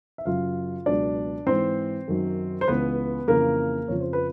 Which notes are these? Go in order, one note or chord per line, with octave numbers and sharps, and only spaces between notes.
E5
F#2 C#3 F#3 F4 F5
C#2 B2 F#3 D4 D5
G#2 E3 C4 C5
F#2 D#3 F#3
C5
C#2 C#3 E3 B3 B4
F2 C#3 E3 A#3 A#4
F2 C#3 F3 C#5
C5
B4